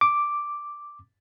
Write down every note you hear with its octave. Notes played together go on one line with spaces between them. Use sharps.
D6